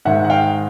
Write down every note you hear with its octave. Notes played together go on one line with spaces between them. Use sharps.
G#2 D#3 G#3 E5 F#5
F#5
F5 G5